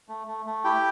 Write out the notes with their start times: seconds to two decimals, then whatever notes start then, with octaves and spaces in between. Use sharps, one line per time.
0.09 A3
0.27 A3
0.46 A3
0.64 E4 G4 G5